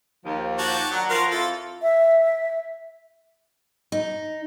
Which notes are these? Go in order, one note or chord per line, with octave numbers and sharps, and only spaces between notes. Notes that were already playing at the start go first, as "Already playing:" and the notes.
D#2 F3
F#4 G4 A5
F#3 D4 A#4 F#5
F3 F#4 A#4 C5 F5
F2 E4 F4 A4
E5
D#4